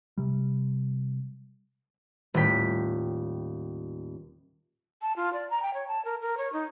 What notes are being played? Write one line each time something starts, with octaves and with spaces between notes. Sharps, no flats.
C3 G3
D#1 A2 G5 B6
A5
F4
D5
A#5
G5
C#5
A5
A#4
A#4
C#5
D#4